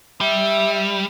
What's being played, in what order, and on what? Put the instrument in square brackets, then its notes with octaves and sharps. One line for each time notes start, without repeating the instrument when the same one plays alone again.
[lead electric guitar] G3 [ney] E5